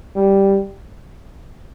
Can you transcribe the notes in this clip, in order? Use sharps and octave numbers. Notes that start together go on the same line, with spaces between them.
G3